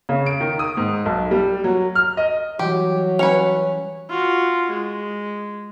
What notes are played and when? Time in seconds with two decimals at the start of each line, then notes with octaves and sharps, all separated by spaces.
0.09 C#3
0.26 D7
0.40 D#3
0.59 D#6
0.77 G#2
1.06 B1
1.31 G3
1.64 F#3
1.95 F6
2.17 D#5
2.59 E3 F#3 G3 G4
3.19 C#4 B4 C#5 C#7 F7
4.09 F4 F#4
4.70 G#3